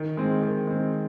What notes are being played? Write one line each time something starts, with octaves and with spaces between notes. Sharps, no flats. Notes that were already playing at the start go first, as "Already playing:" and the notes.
Already playing: D#3
G#3 C4
D#3
G#3 C4